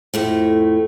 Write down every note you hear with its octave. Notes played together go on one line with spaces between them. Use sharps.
F2 A2 A3